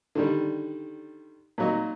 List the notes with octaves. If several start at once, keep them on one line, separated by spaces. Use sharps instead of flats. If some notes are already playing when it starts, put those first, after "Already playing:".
D3 D#3 G3
A#2 F#3 D#4